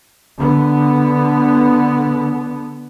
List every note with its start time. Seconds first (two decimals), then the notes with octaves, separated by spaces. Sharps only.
0.38 D3 B3